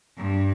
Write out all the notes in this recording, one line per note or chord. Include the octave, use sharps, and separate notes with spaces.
G2